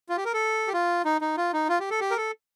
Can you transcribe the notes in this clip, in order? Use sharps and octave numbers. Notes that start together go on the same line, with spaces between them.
F4
G4
A#4
A4
G4
F4
D#4
D#4
F4
D#4
F4
G4
A4
G4
A#4
A4